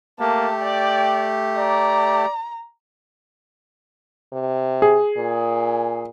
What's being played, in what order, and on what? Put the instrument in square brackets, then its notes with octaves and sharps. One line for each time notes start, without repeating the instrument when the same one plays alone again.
[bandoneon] A3 G4 [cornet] A#3 [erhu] A5
[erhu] D5 [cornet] G5
[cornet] D5 [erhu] A#5
[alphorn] C3
[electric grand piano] G#4
[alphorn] A#2